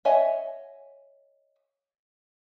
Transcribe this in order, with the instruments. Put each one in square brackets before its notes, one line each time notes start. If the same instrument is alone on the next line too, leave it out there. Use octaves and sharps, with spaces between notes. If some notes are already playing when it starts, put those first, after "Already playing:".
[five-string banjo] C#5 D#5 E5 F#5 G#5